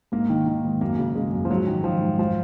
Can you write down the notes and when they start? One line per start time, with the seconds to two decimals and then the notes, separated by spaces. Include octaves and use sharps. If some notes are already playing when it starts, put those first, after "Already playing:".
0.12 G#2 A#3
0.30 D#3
0.46 D#3
0.65 G#2
0.81 F#2 A#3
0.99 C#3
1.15 C#3 G#3
1.33 F#2
1.45 F3
1.50 G#2 F#3
1.67 D#3
1.84 D#3 F3
2.01 G#2
2.19 G#2 F3